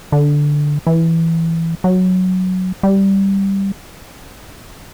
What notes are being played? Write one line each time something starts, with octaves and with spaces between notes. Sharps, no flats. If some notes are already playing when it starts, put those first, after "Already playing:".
D3
E3
F#3
G3